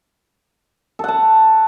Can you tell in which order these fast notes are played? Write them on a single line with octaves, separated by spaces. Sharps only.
A4 F#5 A5